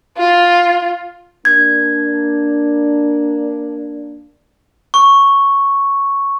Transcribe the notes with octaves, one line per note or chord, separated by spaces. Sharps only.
F4
A#3 D4 G#6
C#6